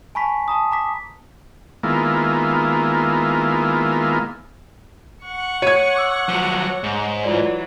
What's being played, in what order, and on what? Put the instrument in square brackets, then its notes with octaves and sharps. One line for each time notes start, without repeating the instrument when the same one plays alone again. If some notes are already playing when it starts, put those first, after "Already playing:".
[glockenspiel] G#5 A5 B5 C#6 B6
A5 A#5 D#6
A#5 D6 B6
[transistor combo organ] D#3 G#3 A#3 B3 E4 F4
[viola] F#5 C#6
[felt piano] C#5 G#6 [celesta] C#7 D#7
[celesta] D6 E6
[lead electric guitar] F3 F#3
G#2
[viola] E3 F#3 [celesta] F4 D5